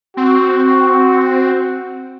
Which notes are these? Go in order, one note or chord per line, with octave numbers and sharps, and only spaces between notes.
C4 F#4